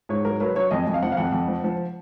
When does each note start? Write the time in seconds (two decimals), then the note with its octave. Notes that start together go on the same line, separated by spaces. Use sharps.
0.09 G#2 C#5
0.25 F#3 A#4
0.40 F#3 B4
0.55 F#3 C#5
0.71 F2 D#5
0.87 F2
0.94 F5
1.02 F3 F#5
1.12 F5
1.17 F2 F#5
1.32 F2
1.48 F3
1.64 F3